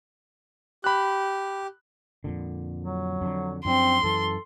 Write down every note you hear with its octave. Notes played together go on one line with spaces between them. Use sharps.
G4 B5 F#6
F2 A#2 D3
F#3
F2 D3
F#2 F3 C4 D4 C6
F#2 E3 A4